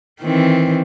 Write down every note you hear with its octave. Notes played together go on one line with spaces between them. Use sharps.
D#3 E3 C4